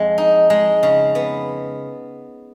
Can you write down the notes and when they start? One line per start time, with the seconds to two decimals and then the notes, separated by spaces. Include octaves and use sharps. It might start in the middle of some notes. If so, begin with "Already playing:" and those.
Already playing: F2 G#3
0.18 D#4
0.50 G#3
0.83 C#3
1.15 B3